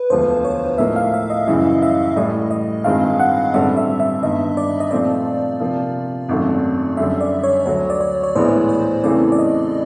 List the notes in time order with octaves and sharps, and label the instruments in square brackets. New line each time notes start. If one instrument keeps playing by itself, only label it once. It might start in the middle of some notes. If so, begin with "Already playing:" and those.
Already playing: [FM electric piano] B4
[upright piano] E1 D2 D3 F3 [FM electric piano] C5
[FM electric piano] C#5
[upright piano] A2 F3 A#3 D#4 [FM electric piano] E5
[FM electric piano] F5
E5
D#5
[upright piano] F#2 C#3 E3 G3 [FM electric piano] E5
[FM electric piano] E5
[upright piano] A2 E3 G3 [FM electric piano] D#5
[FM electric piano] D#5
[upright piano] G2 D#3 G#3 C4 F4 [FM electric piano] F5
[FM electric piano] F#5
[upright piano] A1 G2 D3 G3 C4 [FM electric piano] E5
[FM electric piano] E5
E5
[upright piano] G1 G2 D#3 [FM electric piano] D#5
[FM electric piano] D5
D#5
[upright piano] A#2 F3 A3 C4 D#4 [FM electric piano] D5
[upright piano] C3 F3 A#3
G#1 F#2 D#3 F#3 A3
[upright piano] F#2 D3 G3 [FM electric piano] E5
[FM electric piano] D5
C#5
[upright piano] D2 D3 F#3 [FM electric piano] C#5
[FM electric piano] D5
C#5
C#5
[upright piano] A#1 A2 E3 G#3 B3 [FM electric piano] C5
[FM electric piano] C#5
[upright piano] E2 C#3 E3 A3 C4 [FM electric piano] D5
[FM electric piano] D5
D#5